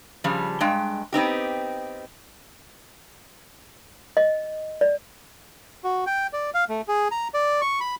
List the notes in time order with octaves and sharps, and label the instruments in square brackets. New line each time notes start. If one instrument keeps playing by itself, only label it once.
[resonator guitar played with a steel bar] C#3 F3 G3
G2 G#3 G5
B3 C4 D#4 G4
[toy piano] D#5
D5
[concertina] F#4
G5
D5
F5
A3
G#4
A#5
D5
C#6
B5